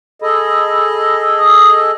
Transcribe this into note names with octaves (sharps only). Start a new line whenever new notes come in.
G#4 A4 D#5 B5
D#6